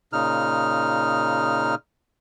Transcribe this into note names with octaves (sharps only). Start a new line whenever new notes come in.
A#2 C#3 D#4 F6